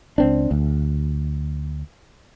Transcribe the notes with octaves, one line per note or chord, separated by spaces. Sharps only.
C#2 C4 D4
D2